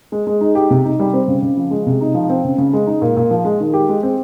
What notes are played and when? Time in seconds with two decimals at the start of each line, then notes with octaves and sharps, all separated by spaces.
0.12 G#3
0.27 G#3
0.41 D#4
0.55 G4
0.71 C3
0.85 D#4
0.99 G3
1.14 C4
1.28 C#3
1.43 C#3
1.57 F3
1.71 G#3
1.87 C3
2.01 D#4
2.14 F3
2.30 C4
2.44 C#3
2.58 C#3
2.73 G#3
2.87 D#4
3.02 A#2
3.17 A#2
3.31 F3
3.45 G#3
3.60 D#3
3.73 G4
3.89 G#3
4.03 C4